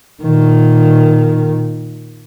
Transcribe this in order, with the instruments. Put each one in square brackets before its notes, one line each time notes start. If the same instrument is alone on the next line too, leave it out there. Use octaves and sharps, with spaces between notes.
[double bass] A#2 D#3